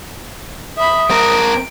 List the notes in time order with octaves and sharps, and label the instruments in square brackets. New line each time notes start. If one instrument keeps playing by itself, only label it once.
[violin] E5 B5 [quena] D#6
[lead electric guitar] C4 A#4 [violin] D7